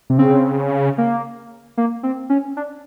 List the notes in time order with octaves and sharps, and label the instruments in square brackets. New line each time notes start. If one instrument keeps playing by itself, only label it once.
[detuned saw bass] C3
[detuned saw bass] C#3 [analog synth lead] C4
[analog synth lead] A#3
A#3
C4
C#4
D4